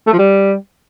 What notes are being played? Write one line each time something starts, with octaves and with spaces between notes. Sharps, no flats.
A3
F3
G3